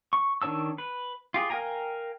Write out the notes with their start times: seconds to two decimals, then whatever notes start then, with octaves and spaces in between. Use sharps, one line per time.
0.13 C#6
0.42 D#3 D4 C#5 A5 E6
0.78 B4
1.34 F4 G4 G#4
1.50 A#4 F5 G5 G#5 A#5